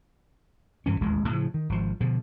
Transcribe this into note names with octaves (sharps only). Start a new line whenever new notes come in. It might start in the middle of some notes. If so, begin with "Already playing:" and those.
G2 E3 C#4
E1 A1 D#2 G#3
A2 C#3 F3
D#3
G#1 F3
B2 D3 F3